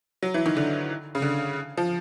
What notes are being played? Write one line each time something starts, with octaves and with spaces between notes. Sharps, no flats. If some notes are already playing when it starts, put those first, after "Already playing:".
F#3
E3
D#3
D3
C#3
D3
F3